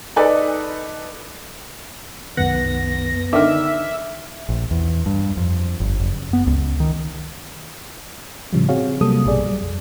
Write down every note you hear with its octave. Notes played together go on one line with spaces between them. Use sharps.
D#4 A4 B4 D5
C2 F#2 D#3 B3 F#5 A#6
D3 D#3 E5 D6 F6
A#1
E2
G2
F2
G1
F#1
B3
C#2
D#3
A2 C#3 F3 G3
C4 F#4 G#4 C#5 F5
C3 F#3 G3 A#3 A4 D#6
A#1 G2 B2 G3 G#4 D5
F#3 G3
F2